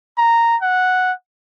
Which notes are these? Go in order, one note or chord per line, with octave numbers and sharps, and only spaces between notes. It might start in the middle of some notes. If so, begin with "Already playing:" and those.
A#5
F#5